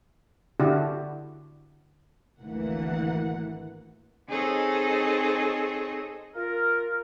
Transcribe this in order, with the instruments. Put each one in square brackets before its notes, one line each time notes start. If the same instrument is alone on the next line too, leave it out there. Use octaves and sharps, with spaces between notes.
[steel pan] D3 D4 E4 F#4 G4
[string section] G#1 D2 E3 A#3 F#5
[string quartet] C4 D#4 G#4 A4 C#5 D#5
[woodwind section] F4 A#4